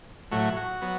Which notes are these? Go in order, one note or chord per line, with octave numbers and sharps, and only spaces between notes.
A2 F#3 A3 F#4
F#4
F#3 B3